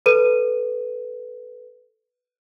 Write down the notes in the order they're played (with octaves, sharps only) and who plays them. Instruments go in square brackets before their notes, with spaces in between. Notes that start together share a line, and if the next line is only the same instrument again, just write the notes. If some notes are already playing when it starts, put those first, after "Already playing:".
[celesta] A4 B4 D#7